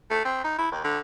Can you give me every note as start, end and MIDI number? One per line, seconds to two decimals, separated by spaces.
0.10 0.24 57
0.25 0.41 60
0.44 0.55 63
0.58 0.69 64
0.72 0.80 39
0.84 0.99 50